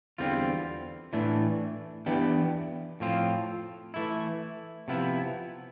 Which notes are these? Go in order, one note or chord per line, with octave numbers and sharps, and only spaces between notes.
E2 D3 G3 C4 F4
A2 E3 A3 D4
E3 B3 D4 G4
A2 F3 C4 F4
E3 A3 E4
C3 F3 B3 E4